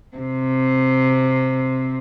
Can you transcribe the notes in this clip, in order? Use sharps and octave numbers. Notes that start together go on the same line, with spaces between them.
C3 C4